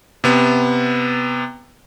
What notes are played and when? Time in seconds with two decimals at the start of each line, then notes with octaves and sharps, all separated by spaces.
0.24 C3 B3